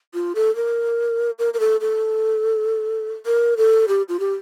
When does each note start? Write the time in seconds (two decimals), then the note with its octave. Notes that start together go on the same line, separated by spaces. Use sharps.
0.14 F4
0.35 A4
0.56 A#4
1.39 A#4
1.54 A#4
1.60 A4
1.81 A4
3.26 A#4
3.57 A4
3.88 G4
4.09 F4
4.20 G4